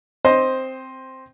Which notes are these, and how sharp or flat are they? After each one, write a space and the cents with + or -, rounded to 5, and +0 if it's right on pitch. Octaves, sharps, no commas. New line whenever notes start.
C4 +0 C5 +5 D#5 +10